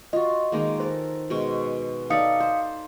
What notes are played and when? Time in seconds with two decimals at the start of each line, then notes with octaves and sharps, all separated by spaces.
0.13 F4 F#4 D#5
0.52 D#3 G#3 A#3
0.80 A4 A#4 C5
1.30 B2 G#3 C#6
2.10 D#4 A4 D5 F5 D#6 C#7
2.40 C5